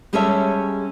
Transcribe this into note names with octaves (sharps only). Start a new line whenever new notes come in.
G3 G#3 C#4 A4 C#5 E5